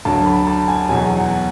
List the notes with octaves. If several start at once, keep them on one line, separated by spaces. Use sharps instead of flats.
D2 D3 F#3 A5
B5
A5
G#5
E2 B2 F#3 G#5
F#5